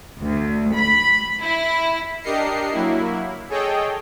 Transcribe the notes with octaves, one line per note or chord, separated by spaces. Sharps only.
D2
B5
E4
D4 G4 A#4 D#5 C7 C#7
F#3 A#3 E4
G#4 A4 C#5 D#5 G5